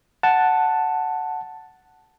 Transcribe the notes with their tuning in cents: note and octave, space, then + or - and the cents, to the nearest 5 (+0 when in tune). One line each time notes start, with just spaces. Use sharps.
F#5 +0 A5 +0